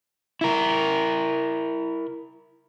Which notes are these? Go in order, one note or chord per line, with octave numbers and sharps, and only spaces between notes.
E4 A#4